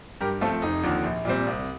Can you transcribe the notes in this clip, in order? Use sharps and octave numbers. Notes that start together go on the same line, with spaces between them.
G2 G4 A#4
F3 A3 C4 F4 A4
F1 D#4
D#2 D3 F3
A#1
A#2 G3 C4
C2